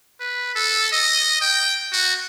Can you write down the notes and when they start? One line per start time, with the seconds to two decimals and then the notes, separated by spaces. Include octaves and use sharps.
0.20 B4
0.55 A4
0.92 D#5
1.41 G5
1.92 F#4